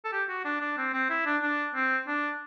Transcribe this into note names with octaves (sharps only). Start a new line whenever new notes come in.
A4
G4
F#4
D4
D4
C4
C4
E4
D4
D4
C4
D4